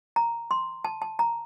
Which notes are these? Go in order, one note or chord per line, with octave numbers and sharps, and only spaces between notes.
A#5
C6
A5
A5
A#5